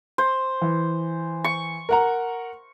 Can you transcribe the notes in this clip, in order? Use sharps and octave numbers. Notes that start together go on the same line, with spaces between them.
C5
E3
C#6
A#4 F#5 A#5